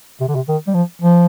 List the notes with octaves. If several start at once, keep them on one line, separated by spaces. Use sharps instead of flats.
C3
D3
C3
D#3
G3
F3
F3